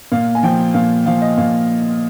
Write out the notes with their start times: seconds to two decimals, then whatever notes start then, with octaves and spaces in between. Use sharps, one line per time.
0.12 A#2 F5
0.35 G#5
0.43 F3 G5
0.74 A#2 F5
1.06 F3 F5
1.22 D#5
1.37 A#2 F5